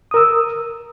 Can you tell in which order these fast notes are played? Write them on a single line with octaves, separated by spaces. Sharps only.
D#6 A#4 E6